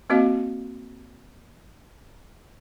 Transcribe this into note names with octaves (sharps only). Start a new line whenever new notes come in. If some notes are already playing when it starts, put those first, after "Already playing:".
A#3 C4 F#4 D#5 F5